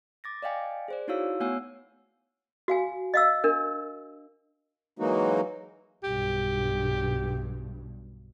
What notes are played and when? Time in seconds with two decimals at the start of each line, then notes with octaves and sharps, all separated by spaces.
0.24 D6 A6 A#6
0.42 D5 D#5 F5 G5 G#5
0.88 G#4 C5 D5
1.08 D#4 E4 F#4 C#5 F5 E6
1.40 A3 B3 C#5 F#5 G#5 E6
2.68 F#4 F5 G#5
3.14 D#5 F5 E6
3.44 D4 A#4
4.99 E3 F#3 G#3 A#3 D#4 F#4
6.04 B1 G2 G4